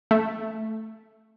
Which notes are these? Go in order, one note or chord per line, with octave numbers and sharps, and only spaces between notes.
A3